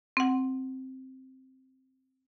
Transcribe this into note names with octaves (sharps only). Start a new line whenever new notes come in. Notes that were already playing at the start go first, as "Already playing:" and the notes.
C4 F#5